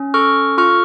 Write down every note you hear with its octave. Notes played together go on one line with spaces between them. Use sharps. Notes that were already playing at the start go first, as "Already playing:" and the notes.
Already playing: C#4
A4 C#6 F6
F4 C#6 F6